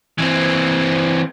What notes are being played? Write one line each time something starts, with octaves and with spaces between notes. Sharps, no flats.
E3 C4